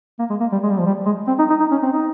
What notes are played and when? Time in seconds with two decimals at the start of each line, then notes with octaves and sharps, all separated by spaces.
0.19 A#3
0.30 G#3
0.40 A#3
0.52 G3
0.63 G#3
0.71 G3
0.79 F3
0.86 G3
1.06 G#3
1.27 C4
1.39 D#4
1.50 D#4
1.60 D#4
1.71 C#4
1.83 C4
1.93 D#4